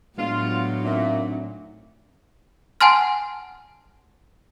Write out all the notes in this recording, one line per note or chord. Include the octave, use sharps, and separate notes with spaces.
A2 F#3 G#3 B3 D4 F4
A#2 C4 D4 D#4 E5
F#5 G#5 A5 C6 F6